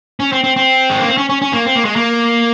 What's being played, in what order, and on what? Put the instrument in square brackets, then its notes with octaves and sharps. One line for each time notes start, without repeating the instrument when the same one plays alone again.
[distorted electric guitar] C#4
C4
C4
C4
G#3
A#3
C4
C#4
C#4
C#4
A#3
C4
A#3
G#3
A#3